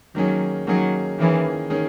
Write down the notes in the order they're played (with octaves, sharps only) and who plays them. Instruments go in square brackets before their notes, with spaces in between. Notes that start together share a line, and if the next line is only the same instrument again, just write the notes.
[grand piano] D#3 A#3 C#4 G#4 [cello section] F#3
[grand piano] D#3 A#3 C#4 G#4 [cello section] F#3
[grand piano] D#3 A#3 C#4 G#4 [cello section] E3
[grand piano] D#3 A#3 C#4 G#4